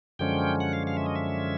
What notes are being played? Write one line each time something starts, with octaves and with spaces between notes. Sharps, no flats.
F#2 D3 F3 G#3 C#4 G5
F#5
F5
F5
E5
D#5
E5